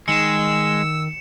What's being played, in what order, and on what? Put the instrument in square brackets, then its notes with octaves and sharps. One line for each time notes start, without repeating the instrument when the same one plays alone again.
[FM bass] D#3 [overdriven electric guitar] G#3 [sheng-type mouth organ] E6 [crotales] C#7 E7